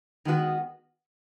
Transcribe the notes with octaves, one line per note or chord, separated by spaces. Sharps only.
D#3 G#3 B3 F#4